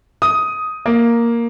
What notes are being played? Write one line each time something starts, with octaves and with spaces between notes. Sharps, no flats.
D#6
A#3